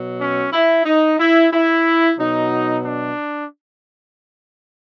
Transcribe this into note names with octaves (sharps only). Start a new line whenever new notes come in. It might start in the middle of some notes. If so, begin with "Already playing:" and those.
Already playing: B2 F#3
C#4
E4
D#4
E4
E4
B2 F#3 D#4
D4